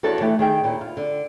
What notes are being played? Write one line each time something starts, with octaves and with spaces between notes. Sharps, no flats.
E2 D4 F#4 A4 C#5 A5
E3 A3 G4
D#3 G#4 G5
D#2 A#2 E4
F4
D3